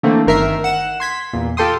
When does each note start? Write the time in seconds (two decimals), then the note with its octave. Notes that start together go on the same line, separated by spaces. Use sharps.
0.03 D3 E3 A3 A#3 C4
0.26 G1 D#3 A#4 E5 C7
0.64 F#5 E7
1.00 C6 G#6 B6
1.33 E2 A#2
1.57 F4 G4 A4 G5 C6 D#6